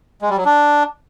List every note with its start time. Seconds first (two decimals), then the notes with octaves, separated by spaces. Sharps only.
0.22 G#3
0.30 G3
0.38 F#3
0.45 D4